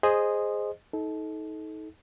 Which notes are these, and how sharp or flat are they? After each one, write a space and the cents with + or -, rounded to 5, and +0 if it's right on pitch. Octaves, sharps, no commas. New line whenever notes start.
G#4 +0 C5 +0 D#5 -10
D#4 +30 A4 -25